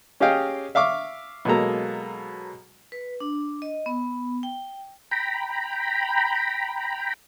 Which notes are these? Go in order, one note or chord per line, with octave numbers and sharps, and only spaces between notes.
C#4 G4 G#4 D#5 F5 G5
E5 F5 C#6 D6
B2 F#3 G#3 A#3 A4 A#5
B4
D4
D#5
B3
G5
G5 A#5 B5